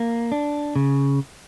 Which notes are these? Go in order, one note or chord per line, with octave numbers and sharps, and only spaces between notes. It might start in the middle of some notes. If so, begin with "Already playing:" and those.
Already playing: A#3
D4
C#3